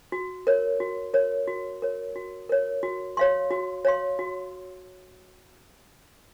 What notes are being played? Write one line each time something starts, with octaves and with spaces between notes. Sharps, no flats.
F#4
A#4 C#5
F#4
A#4 C#5
F#4
A#4 C#5
F#4
A#4 C#5
F#4
C#5 F5 C6
F#4
C#5 F5 C6
F#4